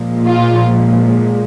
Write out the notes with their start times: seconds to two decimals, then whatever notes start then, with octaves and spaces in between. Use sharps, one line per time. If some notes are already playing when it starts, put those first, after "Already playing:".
Already playing: A#2 F3 G#3
0.26 F4